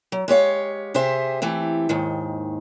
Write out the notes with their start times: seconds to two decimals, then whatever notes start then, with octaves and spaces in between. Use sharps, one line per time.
0.12 F#3
0.28 G#3 G4 C#5 F5
0.94 C3 G4 G#4 C5 E5
1.42 E3 A3 C4 G4
1.89 D#2 G#2 D#3